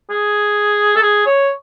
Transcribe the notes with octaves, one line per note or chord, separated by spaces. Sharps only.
G#4
A4
G#4
C#5